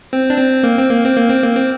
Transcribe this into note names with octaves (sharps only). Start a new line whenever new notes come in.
C4
D4
C4
A#3
C4
A#3
C4
A#3
C4
A#3
C4